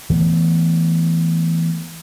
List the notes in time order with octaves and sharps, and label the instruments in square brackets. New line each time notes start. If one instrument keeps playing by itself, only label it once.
[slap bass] E3 A3 B3